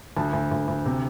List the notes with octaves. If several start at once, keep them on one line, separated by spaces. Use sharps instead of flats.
D2 A5
D2
D2
D2
C3